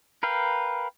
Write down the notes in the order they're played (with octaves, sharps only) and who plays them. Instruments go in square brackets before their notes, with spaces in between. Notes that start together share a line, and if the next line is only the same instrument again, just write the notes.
[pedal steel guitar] A#4 B4 F5 G5